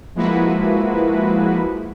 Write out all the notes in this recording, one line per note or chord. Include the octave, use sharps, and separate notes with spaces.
F3 G#3 A#3 E4 F#4 B4